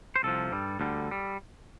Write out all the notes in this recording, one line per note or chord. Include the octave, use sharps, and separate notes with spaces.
C5
C2 C3 F3 A4
G2 G3
D2 D3 G3
G3